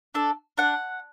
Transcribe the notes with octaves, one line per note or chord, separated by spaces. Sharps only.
D4 A4
D4 F#5